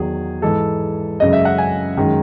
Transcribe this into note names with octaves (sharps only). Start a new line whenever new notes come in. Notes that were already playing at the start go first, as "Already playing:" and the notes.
Already playing: E2 D#3 F#3 G#4
G#2 E3 G#3 A4
F#2 C#3 G#3 D#5
E5
F#5
G#5
F#2 D#3 G#3